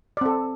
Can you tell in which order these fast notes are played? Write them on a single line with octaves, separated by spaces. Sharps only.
D5 C4 A4